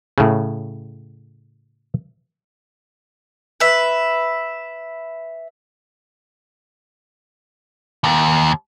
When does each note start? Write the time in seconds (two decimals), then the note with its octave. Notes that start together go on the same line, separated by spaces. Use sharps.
0.18 A2 C#3
3.60 B4 E5
8.04 D#2